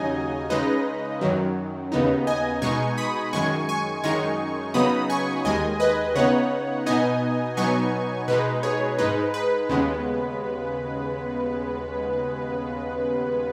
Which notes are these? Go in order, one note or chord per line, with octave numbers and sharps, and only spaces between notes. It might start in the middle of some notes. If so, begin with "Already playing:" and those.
Already playing: D#2 C#3 F#3 D#4 D#5 G#5
C#3 G#3 D#4 B4 D#5
F#2 D#3 F#3
D#2 C#3 B3 D#4
D#5 G#5
B2 G#3 D#4 G#5 C#6
B5 D#6
F#2 D#3 G#3 G#5 C#6
G#5 C#6
F#2 D#3 G#3 D#4 G#5 C#6
C#3 F#3 B3 D#4 B5 D#6
G#5 C#6
D#2 D#3 G#3 D#5 G#5
B4 D#5
C#3 B3 D#4 C#5 F#5
B2 B3 D#4 D#5 G#5
B2 F#3 B3 D#4 G#5 C#6
B2 G#3 D#4 B4
G#4 C#5
G#2 G#3 D#4 B4
B4
D#2 C#3 G#3 B3